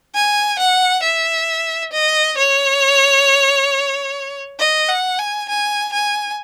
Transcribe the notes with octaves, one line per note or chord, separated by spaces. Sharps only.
G#5
F#5
E5
D#5
C#5
D#5
F#5
G#5
G#5
G#5